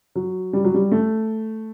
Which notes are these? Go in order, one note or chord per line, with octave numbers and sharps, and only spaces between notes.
F#3
G3
F#3
G3
A3